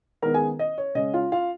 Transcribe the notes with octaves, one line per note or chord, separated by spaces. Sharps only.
D#3 G#3 B3 D#4 A#4 A#5
G#4 G#5
D#5
C#5
C#3 G#3 C#4 D#5
F4 F5
F4 F5